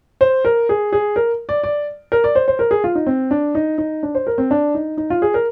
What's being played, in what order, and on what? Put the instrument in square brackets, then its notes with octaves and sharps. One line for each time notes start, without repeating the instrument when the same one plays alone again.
[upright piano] C5
A#4
G#4
G#4
A#4
D5
D5
A#4
D5
C5
C5
A#4
G#4
F4
D#4
C4
D4
D#4
D#4
D4
C5
A#4
C4
D4
D#4
D#4
F4
G#4
A#4